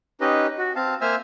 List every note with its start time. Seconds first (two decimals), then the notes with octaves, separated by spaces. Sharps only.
0.21 C#4 D#4 G4 B4 D#5
0.58 F#4
0.75 C4 F5 A5
1.01 A#3 C5 E5 G#5 E6 F6